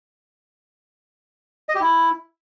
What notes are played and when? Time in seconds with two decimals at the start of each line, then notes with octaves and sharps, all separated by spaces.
1.69 D#5
1.75 G4
1.81 E4